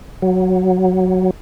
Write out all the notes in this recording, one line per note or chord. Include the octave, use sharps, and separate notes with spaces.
F#3